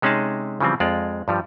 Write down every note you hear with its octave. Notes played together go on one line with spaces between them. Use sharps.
C3 G#3 C#4 D#4 G#4 A5
C#3 E3 F3 G3 C4
F2 G#3 F4 D5
G2 F3 G3